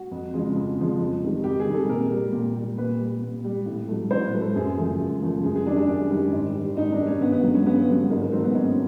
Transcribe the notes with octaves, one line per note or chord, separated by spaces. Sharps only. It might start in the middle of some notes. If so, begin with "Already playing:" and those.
Already playing: F#4
F2
C#3 F3 G#3
F2
C#3 F3 G#3
F2
C3 D#3 G3
F2 G4
G#4
C3 D#3 G3
A4
A#2 A#4
G3
A#2
G3
A#2 B4
G3
A#2
G3
A2
F#3 A3
A2 C5
B4
F#3 A3
A4
F#2 G#4
C#3 F3 A3
F#2
C#3 F3 A3
F#2 G#4
G#4
D#3 G3 D4
D4
F#2
D#3 G3
G#2
D#3 G3
G#2 D#4
D4
D#3 G3
C#4
G2 B3
B3
D3 F#3
C#4
G2 B3
B3
D3 F#3
G#2 A#3
A#3
D#3 F#3 A3 C4
B3
G#2 C#4